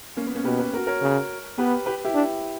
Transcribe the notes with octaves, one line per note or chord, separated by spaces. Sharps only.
A#3 C#4
B3
A#3 C#4
B2 G4 B4
G4 B4
F#4 A#4
A#4 C#5
C#3
B3 G4 B4
G4 B4
E4 G4
D4